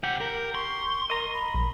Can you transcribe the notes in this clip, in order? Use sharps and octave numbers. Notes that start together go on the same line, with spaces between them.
C3 G4 F#5
A#4
C6 C#6
A#4 D#5 A#5
B5
A#1